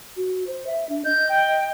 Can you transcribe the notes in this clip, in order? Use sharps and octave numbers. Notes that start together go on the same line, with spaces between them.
F#4
C5
E5
D4
D#5 G6
G5